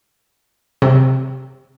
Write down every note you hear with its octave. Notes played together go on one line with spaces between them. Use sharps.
C3